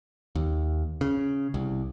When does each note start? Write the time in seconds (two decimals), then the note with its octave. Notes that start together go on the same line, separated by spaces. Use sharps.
0.35 D#2
1.01 C#3
1.54 C2